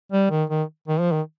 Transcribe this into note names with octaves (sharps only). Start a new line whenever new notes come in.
G3
D#3
D#3
D#3
F3
D#3